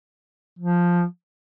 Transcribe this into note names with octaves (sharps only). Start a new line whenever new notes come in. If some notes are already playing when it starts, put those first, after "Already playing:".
F3